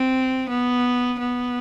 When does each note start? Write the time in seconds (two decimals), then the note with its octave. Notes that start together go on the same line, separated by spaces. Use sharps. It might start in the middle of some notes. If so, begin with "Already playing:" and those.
Already playing: C4
0.50 B3
1.19 B3